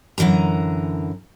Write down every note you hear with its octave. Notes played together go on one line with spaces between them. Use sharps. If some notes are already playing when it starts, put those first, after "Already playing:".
F#2 D3 E3 A#4 A#5